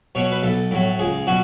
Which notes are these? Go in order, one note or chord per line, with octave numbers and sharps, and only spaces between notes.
B2 F#3 C#5
B4
B1 A4
A2 F#3
C#2 G#4
B2 F#3 F#4